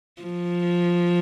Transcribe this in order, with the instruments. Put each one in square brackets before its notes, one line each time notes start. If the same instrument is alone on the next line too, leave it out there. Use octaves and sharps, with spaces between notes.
[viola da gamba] F3